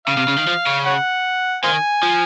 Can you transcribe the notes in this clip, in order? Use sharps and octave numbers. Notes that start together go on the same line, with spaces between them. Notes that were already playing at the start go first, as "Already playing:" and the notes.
C#3 F5
C3
C#3
D#3
F3
C#3
C#5 F#5
D#3 C5 F5 G#5
F3